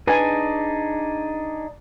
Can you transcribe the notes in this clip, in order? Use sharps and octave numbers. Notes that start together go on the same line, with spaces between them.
D4 D#4 G#4 B4 G#5